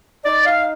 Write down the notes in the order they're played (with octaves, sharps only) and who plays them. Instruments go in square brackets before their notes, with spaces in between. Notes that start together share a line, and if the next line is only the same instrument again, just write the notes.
[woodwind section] D#4 D5
F5